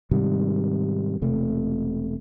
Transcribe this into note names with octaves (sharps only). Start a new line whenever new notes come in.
G#2 C3 D#3 G3
E1 C3 A3